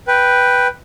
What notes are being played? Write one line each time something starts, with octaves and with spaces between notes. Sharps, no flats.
B4 G5